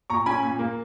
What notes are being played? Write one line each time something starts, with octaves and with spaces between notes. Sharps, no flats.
A#2 A#5 C#6
C#4 G#5 B5
A#2
A#3